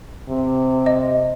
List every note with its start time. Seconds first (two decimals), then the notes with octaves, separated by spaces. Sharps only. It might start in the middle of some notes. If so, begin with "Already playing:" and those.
0.29 C3
0.86 D#5